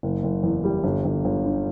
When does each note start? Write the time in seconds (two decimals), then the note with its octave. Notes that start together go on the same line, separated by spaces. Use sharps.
0.03 F#1
0.23 F#1
0.43 E2
0.64 G3
0.84 G1
1.05 G1
1.25 G1
1.45 D3